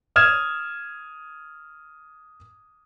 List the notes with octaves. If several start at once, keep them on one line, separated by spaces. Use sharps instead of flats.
D#6 F6 G#6 E7